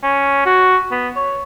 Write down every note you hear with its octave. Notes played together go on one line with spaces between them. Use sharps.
C#4
F#4
B3
C#5